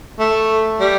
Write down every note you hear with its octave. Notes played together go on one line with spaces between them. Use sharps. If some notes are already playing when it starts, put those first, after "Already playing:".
A3
G3